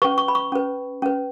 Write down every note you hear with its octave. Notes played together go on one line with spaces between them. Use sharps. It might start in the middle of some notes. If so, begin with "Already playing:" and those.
C#4 B4 C#6
C#6
B5
C#6
C#4 B4
C#4 B4